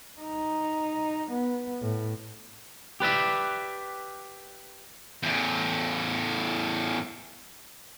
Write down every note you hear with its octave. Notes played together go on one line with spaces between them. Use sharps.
D#4
B3
A2
G4 B4 D5 E5
E2 A2